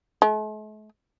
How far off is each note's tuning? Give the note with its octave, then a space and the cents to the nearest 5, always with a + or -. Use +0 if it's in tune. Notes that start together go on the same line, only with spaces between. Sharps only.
A3 -45